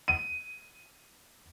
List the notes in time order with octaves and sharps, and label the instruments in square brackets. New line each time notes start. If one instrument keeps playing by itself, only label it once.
[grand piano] D#7